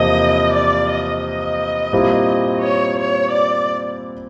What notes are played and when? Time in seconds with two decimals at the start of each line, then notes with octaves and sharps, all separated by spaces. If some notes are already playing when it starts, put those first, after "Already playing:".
Already playing: E2 C3 F3 A#3 D#5
0.54 D5
0.89 D#5
1.23 D#5
1.93 A#2 G3 C4 E4
2.62 C#5
2.96 C#5
3.30 D5